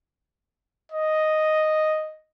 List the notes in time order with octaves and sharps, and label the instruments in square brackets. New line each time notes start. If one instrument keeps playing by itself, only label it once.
[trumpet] D#5